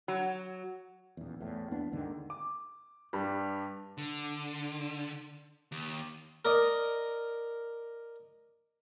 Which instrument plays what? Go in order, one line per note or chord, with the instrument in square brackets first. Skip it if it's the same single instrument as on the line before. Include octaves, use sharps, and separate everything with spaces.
[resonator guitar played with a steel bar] F#3
[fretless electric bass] D#1 E2
E2 A2
E2 A#3 B3 D4
D#2 G#2 D3 D#3
[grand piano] D6
G2 G3
[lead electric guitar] D3
D#2
[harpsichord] A#4 D5 D#5